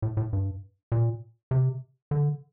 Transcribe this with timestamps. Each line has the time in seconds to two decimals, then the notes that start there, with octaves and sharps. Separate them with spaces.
0.02 A2
0.17 A2
0.33 G2
0.92 A#2
1.51 C3
2.11 D3